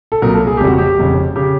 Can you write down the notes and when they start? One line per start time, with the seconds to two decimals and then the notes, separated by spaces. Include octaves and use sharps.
0.12 A4
0.22 C2 A#2 F#3 A#4
0.35 A4
0.47 G#4
0.57 F1 F2 C#3 G4
0.67 F#4
0.78 G4
0.97 F1 F2 C#3
1.36 C#3 G4